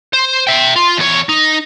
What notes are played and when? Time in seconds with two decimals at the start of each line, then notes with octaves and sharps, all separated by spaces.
0.13 C5
0.47 E5 G5
0.76 F4
0.98 E2 C#5
1.29 D#4